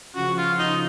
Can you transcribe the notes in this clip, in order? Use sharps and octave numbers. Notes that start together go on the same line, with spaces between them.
C#3 F3 F#4
F4
D#4